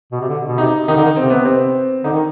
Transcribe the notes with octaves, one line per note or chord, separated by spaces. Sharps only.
B2
C3
D3
B2
C3 D#4
D#3 D#4
D3
D#3
C3 C4
B3
C4
D3 D#4
D#3